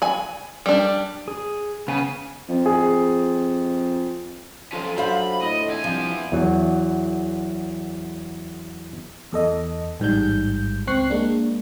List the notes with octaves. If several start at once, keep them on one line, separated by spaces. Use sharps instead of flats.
G#5 B5
G3 D4
G#4
C#3 B3 G#5
F2
G#4
F3 C#4 F4 A4 C5
F#3 D4 C5 F5 B5
A2 D#5
E2 E5 G#5
C2 F3
E2 F#3
E2 A4 D#5
A1 G#2 G3 G6
C#2 C4 C#6 F#6 C7
G#3 A#3 D4